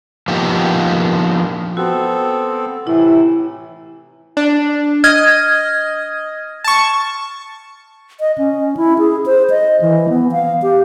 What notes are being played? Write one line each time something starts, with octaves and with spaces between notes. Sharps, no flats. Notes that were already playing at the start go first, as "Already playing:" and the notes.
F3 A#3 B3 D#4 G4
B3 C4 F#4 A4
A2 C3 E3 E4
D4
D#5 F6 G#6
A5 C#6
D#5
C#4
E4
G#4
C5
D#5
E3
B3
F5
G4